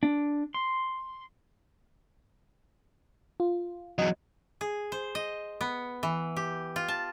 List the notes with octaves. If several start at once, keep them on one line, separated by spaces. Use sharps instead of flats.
D4
C6
F4
E2 F#3 D#5
G#4
C5
D#5
B3
E3
G4
F4
A5